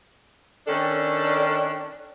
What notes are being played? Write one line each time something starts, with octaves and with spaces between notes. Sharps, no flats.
D#3 C#4 D4 A4